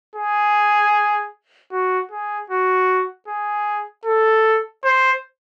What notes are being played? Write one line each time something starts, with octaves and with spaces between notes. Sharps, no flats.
G#4
F#4
G#4
F#4
G#4
A4
C5